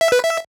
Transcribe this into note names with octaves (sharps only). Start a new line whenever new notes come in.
E5
B4
E5